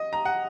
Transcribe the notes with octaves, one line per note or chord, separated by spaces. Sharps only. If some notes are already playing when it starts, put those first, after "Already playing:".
Already playing: D#5
A#5
F#5